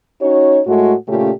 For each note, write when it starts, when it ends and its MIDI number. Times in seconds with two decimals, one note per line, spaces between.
0.21 0.60 61
0.21 0.60 63
0.21 0.60 66
0.21 0.60 73
0.66 0.94 45
0.66 0.94 56
0.66 0.94 57
0.66 0.94 66
1.08 1.31 46
1.08 1.31 49
1.08 1.31 57
1.08 1.31 61
1.08 1.31 65
1.08 1.31 67